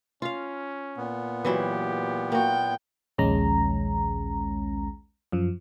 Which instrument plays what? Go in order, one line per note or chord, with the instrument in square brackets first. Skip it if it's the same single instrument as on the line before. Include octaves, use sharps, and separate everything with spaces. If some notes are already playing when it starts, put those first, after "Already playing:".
[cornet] C#4 [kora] F4 F5
[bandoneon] A#2 B3
[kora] E3 F#3 E4 [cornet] G4
[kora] A#3 F#4 [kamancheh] G5
[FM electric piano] A#1 D#2 G#3 C#4 A#5
F#2 F3